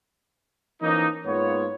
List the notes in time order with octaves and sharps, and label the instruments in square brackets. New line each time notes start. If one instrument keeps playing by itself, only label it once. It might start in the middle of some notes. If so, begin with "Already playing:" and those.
[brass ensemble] E3 F3 A#3 C#4 D#4
G#2 A#3 B3 F4 C#5